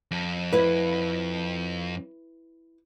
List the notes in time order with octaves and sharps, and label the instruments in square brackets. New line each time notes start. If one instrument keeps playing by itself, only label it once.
[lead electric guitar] F2
[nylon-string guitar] E4 B4